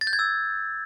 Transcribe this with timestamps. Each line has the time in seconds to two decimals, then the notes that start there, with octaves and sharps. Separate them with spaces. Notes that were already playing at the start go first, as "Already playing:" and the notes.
0.01 A6
0.07 G6
0.13 G#6
0.19 E6